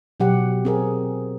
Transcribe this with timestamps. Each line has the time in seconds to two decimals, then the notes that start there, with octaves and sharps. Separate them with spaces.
0.20 B2 F#3 G4 F#5
0.65 C4 G#4 A#4